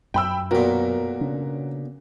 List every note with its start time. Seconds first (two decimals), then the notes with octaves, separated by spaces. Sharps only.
0.14 F#2 G5 B5 E6
0.51 B1 A#2 F#4 A#4
1.20 C#3 C#4 D4